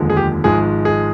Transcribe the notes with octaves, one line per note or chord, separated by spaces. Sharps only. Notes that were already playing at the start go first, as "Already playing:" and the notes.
Already playing: F1 D#2 D3 F3 G#3
G#4
G4
G#1 G#2 F3 G#3 G#4
G#4